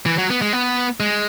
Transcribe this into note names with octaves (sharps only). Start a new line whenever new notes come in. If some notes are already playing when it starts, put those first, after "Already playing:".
E3
F#3
B3
G#3
B3
G#3